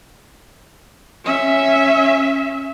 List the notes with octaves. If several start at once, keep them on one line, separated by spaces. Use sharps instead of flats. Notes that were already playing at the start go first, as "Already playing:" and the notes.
C#4 E5